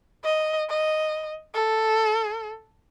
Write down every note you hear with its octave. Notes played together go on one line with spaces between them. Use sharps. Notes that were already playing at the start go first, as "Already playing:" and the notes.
D#5
D#5
A4